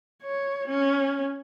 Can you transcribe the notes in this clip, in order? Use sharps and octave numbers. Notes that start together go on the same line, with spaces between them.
C#5
C#4